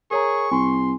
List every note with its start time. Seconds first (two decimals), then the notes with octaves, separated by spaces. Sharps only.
0.11 G#4 A#4 C#5 A#5 C#6
0.51 C2 G#5 C6